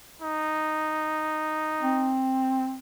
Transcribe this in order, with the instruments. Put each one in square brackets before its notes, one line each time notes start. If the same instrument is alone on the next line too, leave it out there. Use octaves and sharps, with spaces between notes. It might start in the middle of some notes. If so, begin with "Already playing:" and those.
[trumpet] D#4
[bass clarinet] C4